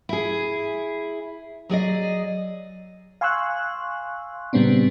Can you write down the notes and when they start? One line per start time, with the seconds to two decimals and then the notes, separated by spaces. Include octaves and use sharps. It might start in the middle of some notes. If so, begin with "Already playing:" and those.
0.09 E4 G#4
1.69 F#3 G#4 D5 D#5
3.21 F5 G#5 C6 C#6 E6 F#6
4.53 A#2 C#3 G3 B3 C4 D4